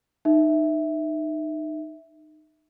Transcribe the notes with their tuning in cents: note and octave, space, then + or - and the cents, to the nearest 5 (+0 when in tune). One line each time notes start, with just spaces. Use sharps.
D#4 -20 E5 -10